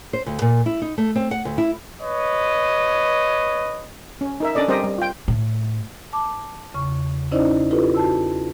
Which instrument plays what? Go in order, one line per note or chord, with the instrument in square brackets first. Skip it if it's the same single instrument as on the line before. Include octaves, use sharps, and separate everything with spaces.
[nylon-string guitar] C5
D2
A#2
E4
D#4
A3
C4
F#5
D2
E4
[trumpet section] B4 C#5 D#5
[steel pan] C#4
D#4 A#4 E5
C#4 D4 A4 D5 D#5
G3 C4 G4 A#4 C5 D#5
G3
F4 G5
[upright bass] A2
[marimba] A5 D6
E2 C#3 C#6
C#4 D#4 E4 C5 D5 D#5
E4 F4 G4 A4 B4
F#4 A5 E6